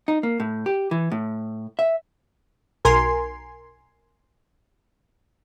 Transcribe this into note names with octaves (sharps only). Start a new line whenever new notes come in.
D#4
A#3
A2
G4
E3
A2
E5
B1 A#4 G#5 C6